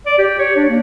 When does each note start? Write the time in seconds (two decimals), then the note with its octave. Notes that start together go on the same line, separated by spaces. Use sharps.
0.06 D5
0.18 G4
0.39 C#5
0.56 D4
0.68 A#3